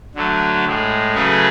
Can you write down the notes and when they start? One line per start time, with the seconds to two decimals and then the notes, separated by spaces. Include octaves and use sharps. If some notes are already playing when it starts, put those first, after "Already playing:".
0.15 D3 F#3 A3
0.65 A2 G#3
1.14 C#3 F#3 A3 G#4 B4